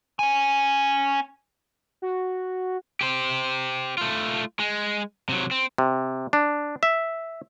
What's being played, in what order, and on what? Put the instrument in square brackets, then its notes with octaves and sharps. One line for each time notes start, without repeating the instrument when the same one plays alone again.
[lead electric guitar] C#4 G#5
[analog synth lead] F#4
[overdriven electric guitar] G4 C5
A3 F4
G#3
C3 F#3
C4
[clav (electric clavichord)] C3
D4
E5